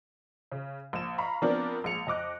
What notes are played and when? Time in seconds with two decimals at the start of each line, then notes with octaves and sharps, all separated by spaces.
0.52 C#3
0.93 A#1 E7
1.18 F5 A#5 B5 C#6
1.42 F3 B3 C4 D4 A#4 D5
1.84 A#1 G#3 C#7 F7
2.07 F2 D#5 D6 F#6